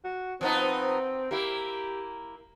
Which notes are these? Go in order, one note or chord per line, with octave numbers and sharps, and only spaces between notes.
F#4
F3 B3 C4 D#4
A#3 E4 G4